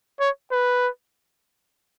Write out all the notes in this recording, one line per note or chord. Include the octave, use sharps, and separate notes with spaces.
C#5
B4